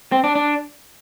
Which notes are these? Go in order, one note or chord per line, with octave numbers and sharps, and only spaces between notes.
C4
D4
D4